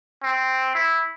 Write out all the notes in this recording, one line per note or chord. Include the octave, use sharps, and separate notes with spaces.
C4
E4